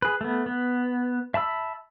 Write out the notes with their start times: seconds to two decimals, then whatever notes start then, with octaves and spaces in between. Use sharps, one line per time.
0.02 G#4 B4
0.21 A3 B3
0.46 B3
1.34 E5 A5 B5 E6